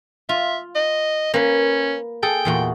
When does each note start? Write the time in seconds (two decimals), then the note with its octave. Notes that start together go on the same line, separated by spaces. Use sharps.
0.29 F4 E5
0.76 D#5
1.34 A#3 C#4 B4
2.23 G#4 A4 G5
2.45 E2 A#2 F#4